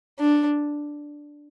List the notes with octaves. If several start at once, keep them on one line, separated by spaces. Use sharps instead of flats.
D4